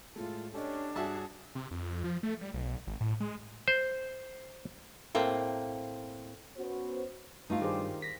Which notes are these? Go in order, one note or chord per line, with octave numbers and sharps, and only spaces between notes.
A2 G#3 F4 A4
C#4 D4 G4 A4 D#5
G2 F#4 G#4 C#5 E5 G#5 A5
C3
F2
F3
A3
G3
B1
G#1
A2
G#3
C5
A2 A#3 C4
B3 C#4 F#4 C5
G2 A3 D#4 F4
D#3 G4 G#4 C5
A#6 B6